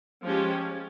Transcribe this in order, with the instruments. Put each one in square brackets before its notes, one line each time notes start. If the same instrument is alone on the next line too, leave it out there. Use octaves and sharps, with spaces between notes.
[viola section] F3 G#3 C#4 G4